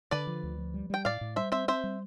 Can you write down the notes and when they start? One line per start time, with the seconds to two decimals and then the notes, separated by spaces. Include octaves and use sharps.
0.11 D3 B4 D5
0.27 F3
0.43 D2
0.58 F3
0.74 G3
0.90 G3 G5
1.05 A2 D5 F5
1.21 A2
1.36 G3 C5 E5
1.52 C4 C5 E5
1.68 C4 C5 E5
1.84 G3